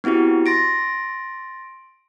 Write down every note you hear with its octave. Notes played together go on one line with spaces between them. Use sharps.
B3 C4 E4 F#4 G4
C6 A6 A#6 D7